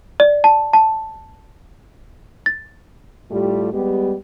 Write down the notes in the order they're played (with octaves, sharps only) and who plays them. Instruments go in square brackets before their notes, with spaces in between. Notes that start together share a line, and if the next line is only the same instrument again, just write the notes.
[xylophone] D5
A5
A5
A6
[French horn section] A2 G3 A3 F4 G4
G3 G#3 B3 G4